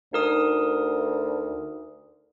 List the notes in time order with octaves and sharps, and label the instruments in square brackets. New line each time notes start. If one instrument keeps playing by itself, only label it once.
[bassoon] D2 [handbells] D#4 A#4 D#6